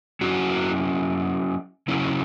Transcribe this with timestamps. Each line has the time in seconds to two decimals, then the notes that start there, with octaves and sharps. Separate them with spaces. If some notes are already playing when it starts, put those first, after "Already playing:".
0.21 F#3 C#4 E4 F#4
1.88 C#3 F#3 C#4 E4